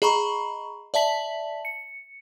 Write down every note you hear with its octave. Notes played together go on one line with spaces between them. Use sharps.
G#4 D#5 A#5 B5 C#6
D5 E5 A5 B6 F#7
C#7